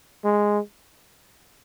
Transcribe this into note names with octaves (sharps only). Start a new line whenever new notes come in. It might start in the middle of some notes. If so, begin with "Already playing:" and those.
G#3